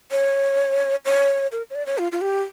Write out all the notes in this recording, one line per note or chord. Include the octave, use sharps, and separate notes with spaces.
C#5
C#5
A#4
C#5
D5
C#5
F4
F4
G4